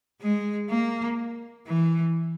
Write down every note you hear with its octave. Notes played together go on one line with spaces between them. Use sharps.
G#3
A#3
E3